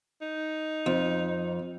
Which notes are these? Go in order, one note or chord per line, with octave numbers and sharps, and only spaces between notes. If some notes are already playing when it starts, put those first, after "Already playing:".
D#4
F2